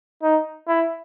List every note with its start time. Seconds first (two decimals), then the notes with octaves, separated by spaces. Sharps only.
0.23 D#4
0.68 E4